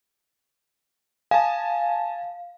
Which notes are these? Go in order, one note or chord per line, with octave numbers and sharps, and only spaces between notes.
F5 G#5 A5